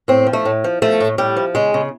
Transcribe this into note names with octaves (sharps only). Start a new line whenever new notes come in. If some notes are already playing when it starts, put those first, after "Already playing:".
A2 C4
F3
A3
A2
F3
F3 A3
A2
A2 G3
F3
C#3 G#3
C#3